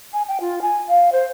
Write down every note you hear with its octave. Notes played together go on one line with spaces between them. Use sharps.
G#5
G5
F4
G#5
F5
C5